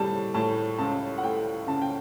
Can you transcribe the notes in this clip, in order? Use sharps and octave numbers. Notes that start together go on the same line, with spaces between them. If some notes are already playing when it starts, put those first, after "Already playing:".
Already playing: A2 G3 A5
A2 A5
C#2 A5
F#5
A3 G5
C#3 A5
G5